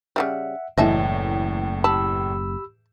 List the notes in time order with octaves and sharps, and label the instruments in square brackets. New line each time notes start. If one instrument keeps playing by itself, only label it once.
[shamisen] C#3 E3 G3 [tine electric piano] E5 F#5
[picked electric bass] F#1 [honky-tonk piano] E2 A2 E3 [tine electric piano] C#5 [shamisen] D#5 E5 A5
[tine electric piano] G4 B5 E6 [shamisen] A5